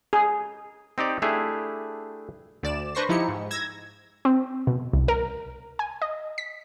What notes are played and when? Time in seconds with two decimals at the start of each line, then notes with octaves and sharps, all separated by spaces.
0.13 G#4
0.98 C4 D#4 G4 D5
1.22 A3 D4 E4 G4 G#4
2.63 D2 D5 E7
2.95 D4 B4 C5 C#6 A#6 C7
3.09 F3 D#4 E4 G4 C#7
3.28 G#2
3.51 E6 G#6 A#6
4.25 C4
4.67 B2
4.93 C2
5.08 A#4
5.79 G#5
6.02 D#5
6.38 B6